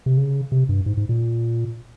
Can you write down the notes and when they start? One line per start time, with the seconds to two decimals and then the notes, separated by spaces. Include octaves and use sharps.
0.06 C3
0.17 C#3
0.52 C3
0.69 G2
0.86 G#2
0.97 G#2
1.09 A#2